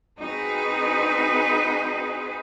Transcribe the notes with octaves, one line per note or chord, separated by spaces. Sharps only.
C4 D#4 F#4 G#4 B4